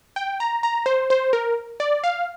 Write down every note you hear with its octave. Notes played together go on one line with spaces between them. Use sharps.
G5
A#5
A#5
C5
C5
A#4
D5
F5